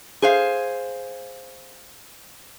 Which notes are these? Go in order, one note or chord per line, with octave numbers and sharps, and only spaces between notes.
G#4 C5 F5